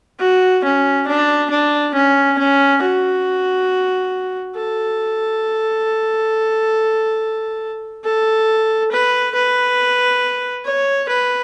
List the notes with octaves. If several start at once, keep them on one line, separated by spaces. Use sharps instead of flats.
F#4
C#4
D4
D4
C#4
C#4
F#4
A4
A4
B4
B4
C#5
B4